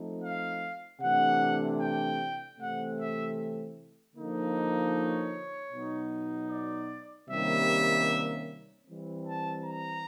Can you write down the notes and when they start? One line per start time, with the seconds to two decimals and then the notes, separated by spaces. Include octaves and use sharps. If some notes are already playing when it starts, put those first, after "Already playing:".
Already playing: F3 A3 C4 D#4
0.22 F5
1.00 C3 E3 A3 D4 F#5
1.79 G5
2.57 C3 E3 A3 C4 F#5
2.97 E5
4.15 D3 F3 A#3 D#4
4.93 C#5
5.72 B2 F#3 B3 D#4
6.50 D5
7.29 C3 D#3 G3 A#3 C#4 E5
8.86 E3 G3 C4
9.25 A5
9.65 A#5